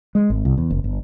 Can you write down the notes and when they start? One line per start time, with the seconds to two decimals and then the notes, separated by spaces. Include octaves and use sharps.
0.15 G#3
0.30 G#1
0.45 C2
0.58 E2
0.70 F#1
0.84 G1